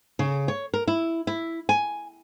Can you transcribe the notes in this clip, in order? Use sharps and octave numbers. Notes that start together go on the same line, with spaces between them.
C#3
C#5
A#4
E4
E4
G#5